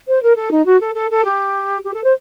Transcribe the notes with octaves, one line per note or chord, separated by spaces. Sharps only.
C5
A#4
A4
D#4
F#4
A4
A4
A4
G4
G4
A4
C5